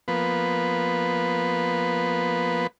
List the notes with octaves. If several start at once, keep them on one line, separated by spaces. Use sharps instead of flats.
F3 A#3 B3 B4